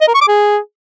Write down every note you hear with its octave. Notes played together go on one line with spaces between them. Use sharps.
D#5
A#4
C#6
D6
G#4